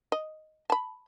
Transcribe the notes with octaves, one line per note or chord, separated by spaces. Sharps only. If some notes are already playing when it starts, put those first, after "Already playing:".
D#5
A5 B5